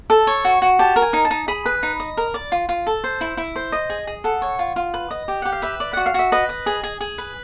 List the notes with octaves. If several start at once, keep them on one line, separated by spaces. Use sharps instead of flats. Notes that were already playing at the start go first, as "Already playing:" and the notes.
A4
C#5
F#4
F#4
G4 A5
A#4
G#5
D#4
A5
D#4
G#4 B5
B4
D#4
D#5
A#4
D5
F4
F4
A4
C5
E4
E4
C5
D#5
G#4
G#4
A4 F#5
C#5
F4
F4
B4
D#5
G4
G4 F#5
F5
B4 E5
D5
F#4 F#5
F5
F#4 E5
B4 D#5
D#5
G#4
G#4
G#4
B4